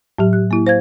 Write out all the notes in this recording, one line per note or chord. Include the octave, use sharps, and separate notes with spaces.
A2 F#3 G4
F#6
A#3 E4
C5 F5 G#6